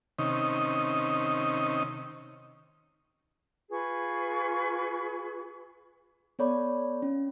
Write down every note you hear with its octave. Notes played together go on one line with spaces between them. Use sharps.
C3 D#3 C#4 D#4
F4 G#4 B4 C#6
B3 A4 C#5 D5 B5
C#4